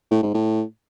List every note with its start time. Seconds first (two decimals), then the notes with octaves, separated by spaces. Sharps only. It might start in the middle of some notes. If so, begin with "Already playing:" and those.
0.11 A2
0.23 G#2
0.34 A2